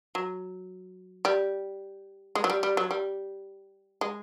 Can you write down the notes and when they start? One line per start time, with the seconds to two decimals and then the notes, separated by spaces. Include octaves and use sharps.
0.15 F#3
1.25 G3
2.35 G#3
2.44 F#3
2.50 G3
2.63 G3
2.77 F#3
2.91 G3
4.01 G#3